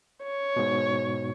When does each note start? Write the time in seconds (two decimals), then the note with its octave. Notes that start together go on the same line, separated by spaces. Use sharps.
0.23 C#5
0.56 G#2 B2